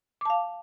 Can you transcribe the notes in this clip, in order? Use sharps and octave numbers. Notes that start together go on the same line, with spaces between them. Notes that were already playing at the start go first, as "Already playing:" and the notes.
F5 A5 D6